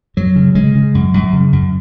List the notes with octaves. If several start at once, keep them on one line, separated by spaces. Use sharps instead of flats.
F#2 F#3
C#3
C#3 G#3
C#3
F#2
F#2
C#3
F#2